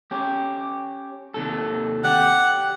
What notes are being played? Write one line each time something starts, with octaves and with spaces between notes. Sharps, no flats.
C#4 G4
D#2 C3 A4
G4 D5 F#5